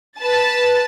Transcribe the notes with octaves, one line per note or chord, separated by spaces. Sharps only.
B4 A5 A6